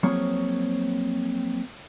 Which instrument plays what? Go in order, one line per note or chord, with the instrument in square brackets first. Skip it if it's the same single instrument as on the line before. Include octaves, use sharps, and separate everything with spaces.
[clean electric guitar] F3 F#3 A#3 C4 G#4 C#5